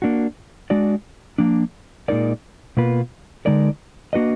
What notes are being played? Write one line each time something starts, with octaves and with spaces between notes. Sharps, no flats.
A#3 D4 F#4
G#3 D4 F#4 D5
F3 A#3 D4
A#2 G#3 D#4 A#4 D5
B2 A#3 F4 B4
D3 G#3 D#4 A#4 D5
A#3 D4 F#4 B4 D#5